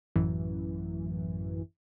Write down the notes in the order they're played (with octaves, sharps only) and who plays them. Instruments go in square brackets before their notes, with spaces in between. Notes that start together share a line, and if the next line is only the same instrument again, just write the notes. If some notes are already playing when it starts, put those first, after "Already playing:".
[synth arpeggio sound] A1 F#2 E3